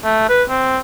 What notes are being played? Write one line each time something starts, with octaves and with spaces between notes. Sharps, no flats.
A3
B4
C4